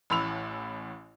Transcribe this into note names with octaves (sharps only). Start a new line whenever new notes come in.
A1 A2 B5 E6 F7